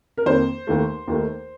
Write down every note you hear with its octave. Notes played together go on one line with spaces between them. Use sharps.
A#4
F2 D#3 A#3 C5
D#2 D#3 A3
D#2 D#3 A3